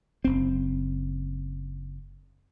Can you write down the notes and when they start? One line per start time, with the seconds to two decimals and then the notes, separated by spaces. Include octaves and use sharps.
0.25 F#1 C4